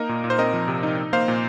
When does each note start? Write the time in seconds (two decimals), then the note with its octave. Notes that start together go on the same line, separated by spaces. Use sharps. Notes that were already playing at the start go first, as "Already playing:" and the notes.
Already playing: A#3 D#4 A#4 D#5
0.09 A#2
0.24 A#2
0.30 C5
0.38 C4 A#4 D#5
0.53 F3
0.68 C3
0.83 D#4
0.98 D#4
1.13 A#3 C5 F5
1.28 A#2